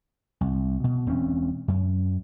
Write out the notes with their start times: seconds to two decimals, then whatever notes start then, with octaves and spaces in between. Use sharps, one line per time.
0.41 C2
0.84 B2
1.06 E1 C4 C#4
1.68 F#2